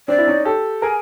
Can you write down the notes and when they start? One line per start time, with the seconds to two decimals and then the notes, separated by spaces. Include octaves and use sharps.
0.08 C4 D4 D5
0.18 E4
0.27 C#4 D#4
0.45 G4 A4
0.82 G#4 A#4 G#5